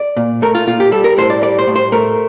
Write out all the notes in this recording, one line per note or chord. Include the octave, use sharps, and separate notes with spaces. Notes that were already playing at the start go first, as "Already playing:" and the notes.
Already playing: D5
A#2
A3 A#4
F4
A#2 F4
G4
G3 A4
A#4
A2 C5
D5
G3 D5
C5
A2
C5
A3 A#4